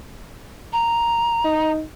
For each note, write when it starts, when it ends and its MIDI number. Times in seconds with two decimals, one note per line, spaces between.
0.73 1.71 82
1.45 1.84 63